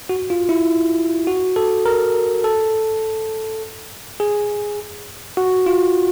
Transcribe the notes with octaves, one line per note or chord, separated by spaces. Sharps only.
F#4
F4
E4
F#4
A4
A#4
A4
G#4
F#4
F4